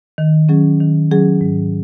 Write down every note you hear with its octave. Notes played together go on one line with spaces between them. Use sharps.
D#3
F#3 C#4 G#4
D#3
F#3 C#4 G#4
G#2